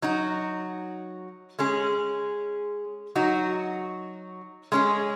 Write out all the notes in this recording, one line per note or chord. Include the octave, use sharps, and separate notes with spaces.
F#3 D#4 F#4
G#3 C#4 G#4
F#3 D#4 F#4
G#3 C#4 G#4